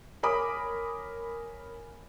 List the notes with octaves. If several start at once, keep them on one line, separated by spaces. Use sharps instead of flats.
A#4 C#5 G#5 B5 D6 D#6